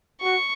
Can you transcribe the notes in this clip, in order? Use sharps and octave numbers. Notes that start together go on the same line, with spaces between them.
F#4 C#6